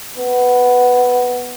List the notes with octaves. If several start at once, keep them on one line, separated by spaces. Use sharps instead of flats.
B3